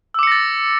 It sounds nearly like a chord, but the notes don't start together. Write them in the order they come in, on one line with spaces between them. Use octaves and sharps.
E6 D6 C#7 A#6 A6